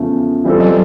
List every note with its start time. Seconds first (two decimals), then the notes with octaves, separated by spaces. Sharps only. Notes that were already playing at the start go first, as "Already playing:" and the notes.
Already playing: E2 C#3 F3 A3
0.44 E3 G3 C4 F4 A4
0.60 F#3